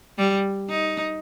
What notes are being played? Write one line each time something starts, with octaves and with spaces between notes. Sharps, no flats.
G3
D#4